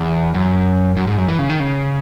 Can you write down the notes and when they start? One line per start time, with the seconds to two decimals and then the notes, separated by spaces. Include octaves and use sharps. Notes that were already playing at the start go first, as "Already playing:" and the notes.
Already playing: E2
0.34 F#2
0.97 F#2
1.07 G#2
1.18 F#2
1.28 E3
1.39 C#3
1.50 D#3
1.60 C#3